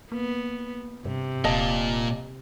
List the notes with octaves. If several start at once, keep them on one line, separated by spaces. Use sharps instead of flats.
A#3 B3
G2 C3
D#1 A#2 D#5 A5